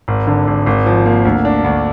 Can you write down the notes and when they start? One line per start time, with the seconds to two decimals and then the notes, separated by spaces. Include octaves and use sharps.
0.08 G#1
0.27 D3
0.47 G#1
0.66 G#1
0.86 F3
1.06 A#3
1.25 D2
1.45 D4
1.64 D2